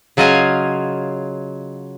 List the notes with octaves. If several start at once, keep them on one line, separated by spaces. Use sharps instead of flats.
C#3 F#3 F4 D#5 F5 G#5